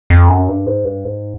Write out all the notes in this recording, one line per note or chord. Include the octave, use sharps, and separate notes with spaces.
F2
F#2
G2
G#2
G2
G#2